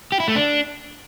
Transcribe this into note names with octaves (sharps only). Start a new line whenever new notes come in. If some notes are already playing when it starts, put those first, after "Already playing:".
G4
E4
A3
D4